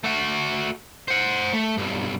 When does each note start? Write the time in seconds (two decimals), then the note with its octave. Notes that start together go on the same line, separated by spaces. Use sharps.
0.04 A3 F#4
1.08 C5 F#5
1.53 A3
1.77 B1 G2